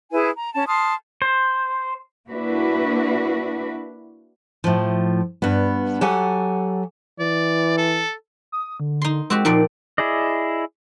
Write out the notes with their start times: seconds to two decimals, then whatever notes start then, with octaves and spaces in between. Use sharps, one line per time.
0.12 E4 G#4 B4 G#5
0.34 A#5
0.54 C#4 A5
0.67 A5 C6 D#6 F6
1.22 C5
2.28 A#3 D4 E4 F#4 B4
4.64 A2 F3
5.42 G2 B3
6.01 F#3 G4 A4 F#5 G#5
7.19 E3 D5
7.77 A4
8.52 D#6
8.80 D3
9.02 D#4 C6
9.30 G#3 C4 F#4 G4
9.45 A#2 F3 D#4 D5
9.98 E4 G#4 D5 D#5